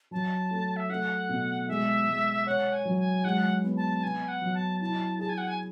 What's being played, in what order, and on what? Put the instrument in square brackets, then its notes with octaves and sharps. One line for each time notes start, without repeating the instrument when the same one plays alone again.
[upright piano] F#3 [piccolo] A5
[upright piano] A3
[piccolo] E5
[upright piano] A3 [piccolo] F#5
[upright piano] B2
[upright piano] G#3 [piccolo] E5
[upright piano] G#3
[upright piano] C#5 [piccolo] F#5
[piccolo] G#5
[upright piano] F#3
[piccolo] G#5
[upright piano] G#3 [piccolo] F#5
[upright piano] B3
[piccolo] A5
[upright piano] B3 [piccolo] G#5
[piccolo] F#5
[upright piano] F#3
[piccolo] A5
[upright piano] E4 [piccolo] A5
[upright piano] G#4 [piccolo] A5
[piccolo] G#5
F#5
G#5